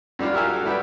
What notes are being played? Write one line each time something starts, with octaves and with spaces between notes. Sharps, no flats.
F#2 G3 D4 F4
F#4 G4 A#4 E5 F5 G#5
F#4 A4
G3 E4 F#4 B4 G5